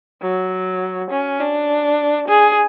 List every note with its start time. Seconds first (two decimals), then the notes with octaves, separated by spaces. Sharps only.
0.22 F#3
1.10 C#4
1.40 D4
2.28 G#4